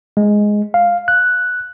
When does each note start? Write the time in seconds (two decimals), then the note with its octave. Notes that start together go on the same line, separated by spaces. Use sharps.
0.17 G#3
0.74 F5
1.08 F#6